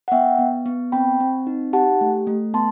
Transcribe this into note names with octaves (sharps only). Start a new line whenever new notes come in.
F#5
B3 E5 G5
B3
B3
C4 G5 B5
C4
D#4
G4 F#5 A5
A3
A3
B3 A5 C6